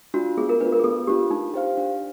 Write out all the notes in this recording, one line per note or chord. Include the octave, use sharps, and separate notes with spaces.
D4 F4 F#4
B3 G#4
A#4
D4 F4 B4
A#4
G#4
B3 A4
D4 F4 G4
D4 D#4
G4 C5 F5
D4